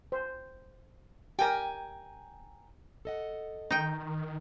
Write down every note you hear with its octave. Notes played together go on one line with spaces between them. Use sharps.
C5
G4 A#4 G5 G#5 A#5
A4 D#5 F#5
D#3 D#4 G5